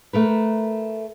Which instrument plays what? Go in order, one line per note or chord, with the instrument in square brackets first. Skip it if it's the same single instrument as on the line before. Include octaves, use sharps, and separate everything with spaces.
[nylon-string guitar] A3 A#4 B4